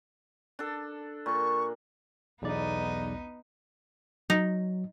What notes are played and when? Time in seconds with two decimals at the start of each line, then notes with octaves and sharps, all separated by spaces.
0.59 D4 A4
1.26 A#2 C#6
2.42 B1 E2 B3 D#4 D5
4.30 F#3 D#4